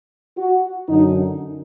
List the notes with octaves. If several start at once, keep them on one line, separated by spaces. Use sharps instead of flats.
F#4
F#2 D3 F#3 D#4